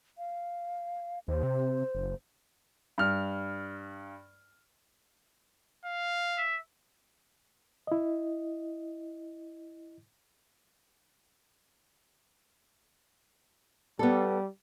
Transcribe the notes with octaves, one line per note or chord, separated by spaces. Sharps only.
F5
D#2 C5
C3
F#1
G2 F6
F5
E5
E4 D#5
G3 B3 A4